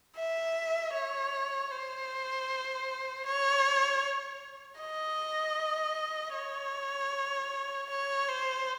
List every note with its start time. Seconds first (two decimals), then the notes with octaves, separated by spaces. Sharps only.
0.16 E5
0.93 C#5
1.71 C5
3.25 C#5
4.80 D#5
6.35 C#5
7.90 C#5
8.28 C5